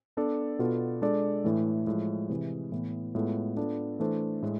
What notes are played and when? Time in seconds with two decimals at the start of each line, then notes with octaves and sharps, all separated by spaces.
0.17 B3 D4 A4 D5
0.59 B2 B3 F4 A4 D5
1.02 G#3 D4 A4 D5
1.44 A2 E3 A3
1.87 A2 F3 G#3
2.29 C3 E3 G#3
2.72 A2 E3 B3
3.15 A2 G#3 B3 F4 A4
3.57 B3 D4 F4 A4 D5
3.99 E3 A3 D4 A4 C5
4.42 A2 G#3